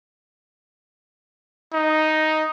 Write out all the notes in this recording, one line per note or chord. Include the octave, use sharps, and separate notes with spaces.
D#4